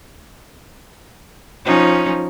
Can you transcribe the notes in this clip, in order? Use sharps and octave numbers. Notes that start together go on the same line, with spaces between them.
F3 C#4 D#4